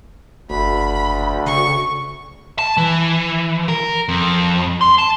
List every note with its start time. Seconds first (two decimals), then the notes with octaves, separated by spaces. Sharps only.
0.50 F#1 D2 B5
1.46 C#3 C#6
2.59 A5
2.77 E3
3.69 A#4
4.09 F2
4.81 C6
4.98 A5